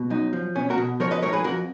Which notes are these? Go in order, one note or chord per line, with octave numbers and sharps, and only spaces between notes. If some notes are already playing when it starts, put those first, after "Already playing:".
Already playing: B2
F#2 D#4
F3
B2 C#4
F#4 A#4
B2
F3 A#4 C#5
B4 D#5
G#2 A#4 C#5
G#4 B4
F2 F#4 A#4